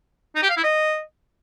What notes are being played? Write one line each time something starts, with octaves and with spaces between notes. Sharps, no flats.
D#4
G4
F5
E4
D#5